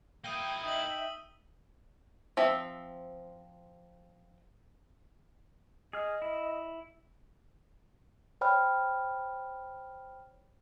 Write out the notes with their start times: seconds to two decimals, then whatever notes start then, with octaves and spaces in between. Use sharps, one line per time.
0.24 A#3 E4 G5 D#6 D#7 G7
0.64 D#4 E5 G5 D#6 F#7
2.37 F3 C4 E5
5.93 G#4 D#5 F6
6.22 E4
8.41 C5 C#5 G5 B5 F6